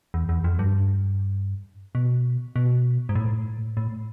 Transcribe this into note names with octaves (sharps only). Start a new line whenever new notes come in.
E2
E2
F2
G2
B2
B2
G#2
A2
A2